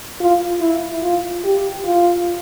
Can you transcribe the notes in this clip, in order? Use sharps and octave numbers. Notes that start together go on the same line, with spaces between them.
F4
E4
F4
G4
F4